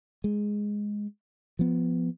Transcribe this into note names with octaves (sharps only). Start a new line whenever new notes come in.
G#3
F3 B3